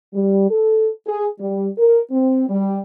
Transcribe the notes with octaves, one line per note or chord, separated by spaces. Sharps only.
G3
A4
G#4
G3
A#4
C4
G3